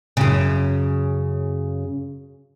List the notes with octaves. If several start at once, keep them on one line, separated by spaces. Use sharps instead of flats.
F#2 C#3